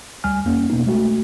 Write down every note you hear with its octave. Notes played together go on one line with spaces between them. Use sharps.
D2 G3 G#5 F6
F2 A#3 C#4
B2 A#3 B3 D#4
G#3 A3 F#4